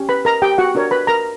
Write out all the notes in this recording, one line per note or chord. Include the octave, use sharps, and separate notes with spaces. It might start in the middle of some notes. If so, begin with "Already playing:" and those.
Already playing: C#4 G4
B4 B5
A#4 A#5
G4 G5
F#4 F#5
D4 F#4 A#4 C#5
B4 B5
A#4 A#5